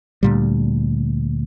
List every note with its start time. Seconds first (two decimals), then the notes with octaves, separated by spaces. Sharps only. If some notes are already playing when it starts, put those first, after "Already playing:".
0.23 D2 A#2 G3